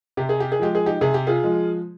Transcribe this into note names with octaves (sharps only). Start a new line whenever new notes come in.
C3 G4
G#4
G4
G#4
F3 G#3 G4
G#4
D#4 G4
C3 G#4
G4
F4 G#4
F3 G#3